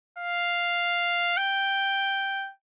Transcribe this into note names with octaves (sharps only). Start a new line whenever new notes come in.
F5
G5